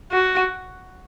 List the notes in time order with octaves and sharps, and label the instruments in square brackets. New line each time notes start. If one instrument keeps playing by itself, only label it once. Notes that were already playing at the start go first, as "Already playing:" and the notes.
[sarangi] F#4